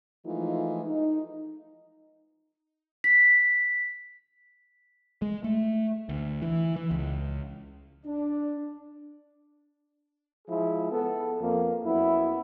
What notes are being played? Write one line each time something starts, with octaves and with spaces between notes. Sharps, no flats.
E3 F3 G#3 A3 D#4 F4
D#4
B6
G#3
A3
D2
E3
E3
C#2
D4
F3 G#3 E4 G#4
B3 A4
F2 A#3
F#2 B3 E4